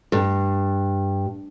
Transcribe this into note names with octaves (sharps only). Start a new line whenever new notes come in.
G2